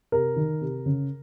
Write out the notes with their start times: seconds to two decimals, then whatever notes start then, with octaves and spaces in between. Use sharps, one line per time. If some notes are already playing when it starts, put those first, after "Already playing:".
0.12 C3 A#4
0.36 D#3
0.61 C3
0.86 C#3